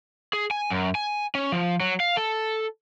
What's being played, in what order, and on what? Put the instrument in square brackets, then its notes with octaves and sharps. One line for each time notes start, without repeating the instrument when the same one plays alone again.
[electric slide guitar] G#4
G#5
F#2
G#5
C#4
F3
F#3
F5
A4